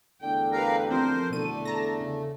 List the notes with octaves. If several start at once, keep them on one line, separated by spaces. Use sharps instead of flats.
E2 D3 A3 G5
G4 A#4 B4 F5 A#5
F3 C4 A4 A#4 C5
E2 B2 D3 A3 D#7
A5 A#5 A#6
C#3